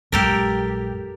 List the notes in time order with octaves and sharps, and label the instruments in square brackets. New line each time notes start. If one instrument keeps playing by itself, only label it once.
[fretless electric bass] A#1 F#2 G#3 [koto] G4 A4 A#4